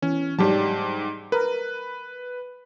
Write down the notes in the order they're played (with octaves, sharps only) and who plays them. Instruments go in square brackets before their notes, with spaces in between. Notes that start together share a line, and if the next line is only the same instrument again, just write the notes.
[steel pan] E3 [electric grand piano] C#4
[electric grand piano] G#2 G4 A5 [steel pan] F#3 G3
[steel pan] A#4 [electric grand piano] B4